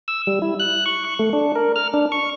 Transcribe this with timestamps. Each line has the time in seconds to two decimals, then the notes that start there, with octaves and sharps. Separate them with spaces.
0.08 E6
0.27 G3
0.42 E4
0.60 F#6
0.86 C#6
1.05 C#6
1.19 A3
1.33 D4
1.55 A#4
1.76 F6
1.94 D4
2.12 C#6